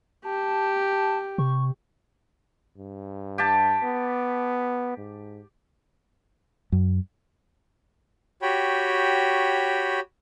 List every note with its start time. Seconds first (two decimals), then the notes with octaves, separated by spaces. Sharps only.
0.24 G4 A5
1.38 C3 C#6
2.78 G2
3.38 G4 A5
3.83 B3
4.97 G#2
6.72 F#2
8.42 F#4 G4 C#5 G5 B5